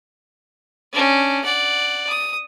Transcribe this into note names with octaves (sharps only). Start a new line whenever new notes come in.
C#4 D4
D5 F#5
D#6